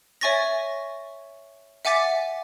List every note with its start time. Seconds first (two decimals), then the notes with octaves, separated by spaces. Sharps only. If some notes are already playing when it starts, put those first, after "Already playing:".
0.21 C#5 E5 G#5 C#6 A6 A#6
1.85 E5 F#5 G#5 D6 A6 B6